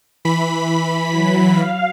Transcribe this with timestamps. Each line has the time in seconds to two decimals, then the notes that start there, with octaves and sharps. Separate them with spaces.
0.25 E3 B5 B6
1.10 F#3
1.50 F5